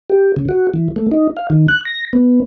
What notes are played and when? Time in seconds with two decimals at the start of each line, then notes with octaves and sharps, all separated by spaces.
0.10 G4
0.36 C#3
0.49 F#4
0.74 E3
0.96 A3
1.11 D#4
1.37 F5
1.50 D#3
1.68 F#6
1.85 A#6
2.13 B3